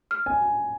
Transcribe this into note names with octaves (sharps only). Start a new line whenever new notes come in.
F6
G#5